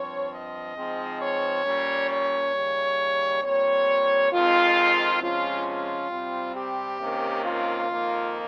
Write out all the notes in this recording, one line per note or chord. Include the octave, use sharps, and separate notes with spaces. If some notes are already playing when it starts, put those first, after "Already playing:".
Already playing: G2 F3 C4 C#5
D#5
G#2 F3 G#3 C4
C#5
A#2 G3 C#4
C#5
D#2 C#3 G3
A#2 G3 C4 C#5
F2 D#3 G#3 C4 F4
C3 F3 G#3 C#4 F4
F4
C3 G3 C4
G4
C3 D#3 A#3 C#4
F4
F2 D#3 A#3